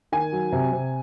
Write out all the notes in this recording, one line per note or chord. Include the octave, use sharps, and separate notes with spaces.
D#3 G#5
F#3
C3
C3